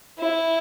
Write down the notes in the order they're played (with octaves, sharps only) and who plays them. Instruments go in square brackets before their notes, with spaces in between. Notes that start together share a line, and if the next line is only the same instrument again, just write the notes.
[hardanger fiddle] E4